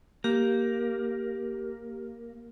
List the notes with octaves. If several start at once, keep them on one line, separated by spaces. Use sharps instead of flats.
A#3 G4